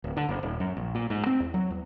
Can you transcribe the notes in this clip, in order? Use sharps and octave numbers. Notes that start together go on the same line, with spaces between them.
D1
D3
F#1
D#1
F#2
A#1
A#2
G#2
C4
E2
F#3
E2